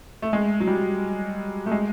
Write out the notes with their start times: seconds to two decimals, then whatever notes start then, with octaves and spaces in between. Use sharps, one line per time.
0.22 A3
0.33 G#3
0.60 F#3
0.67 G3
1.66 A3
1.71 G#3